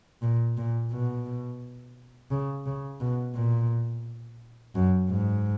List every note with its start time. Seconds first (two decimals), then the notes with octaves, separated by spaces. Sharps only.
0.22 A#2
0.58 A#2
0.92 B2
2.31 C#3
2.66 C#3
3.01 B2
3.36 A#2
4.75 F#2
5.10 G#2